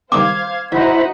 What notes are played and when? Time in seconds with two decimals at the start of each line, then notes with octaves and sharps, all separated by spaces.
0.12 D#3 G3 B3 C5 F5 D6 G#6
0.72 E3 D#4 E4 F#4 C5 B5